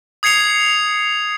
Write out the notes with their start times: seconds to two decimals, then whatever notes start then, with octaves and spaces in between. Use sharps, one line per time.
0.23 D#6 G#6 C7 C#7 F7